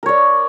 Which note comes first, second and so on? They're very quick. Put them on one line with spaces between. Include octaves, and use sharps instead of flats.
A#4 C#5 D5